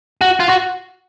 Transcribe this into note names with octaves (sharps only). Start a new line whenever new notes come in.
F#4
F4
F#4